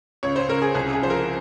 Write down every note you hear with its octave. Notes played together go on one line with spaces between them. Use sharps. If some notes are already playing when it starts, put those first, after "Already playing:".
C#2 C#5
C5
C#2 A#4
G#4
C2 G#4
G#4
F3 C5
A#4